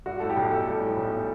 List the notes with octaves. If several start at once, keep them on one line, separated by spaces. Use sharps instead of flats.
G3 F#4
A2 A4
G4
B1
B1 A4
G3
A2
B1